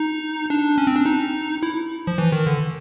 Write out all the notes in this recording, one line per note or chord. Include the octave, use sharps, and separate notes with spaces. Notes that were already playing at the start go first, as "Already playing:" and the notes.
Already playing: D#4
D4
C#4
C4
D4
D#4
E4
F3
E3
D#3
D3